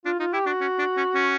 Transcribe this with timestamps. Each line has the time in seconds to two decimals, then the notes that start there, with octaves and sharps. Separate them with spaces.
0.05 D4 F4
0.20 D#4 F4
0.33 E4 G4
0.46 D4 F#4
0.61 C#4
0.78 D4
0.97 C#4
1.15 C#4